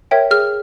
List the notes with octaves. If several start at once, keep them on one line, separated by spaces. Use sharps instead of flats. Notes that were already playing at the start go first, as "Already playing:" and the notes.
A#4 C#5 E5 G5
G#4 F6